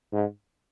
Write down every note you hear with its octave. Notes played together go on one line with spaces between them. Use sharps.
G#2